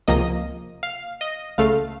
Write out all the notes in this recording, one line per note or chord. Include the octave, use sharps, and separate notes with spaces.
C#2 C3 F3 A#3 D#5
F5
D#5
C#2 C#3 A3 F5